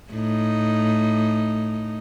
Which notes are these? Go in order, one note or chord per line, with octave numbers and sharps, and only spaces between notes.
A2 D#4